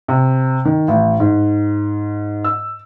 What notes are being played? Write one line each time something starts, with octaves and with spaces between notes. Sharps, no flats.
C3
D#3
A1
G#2
E6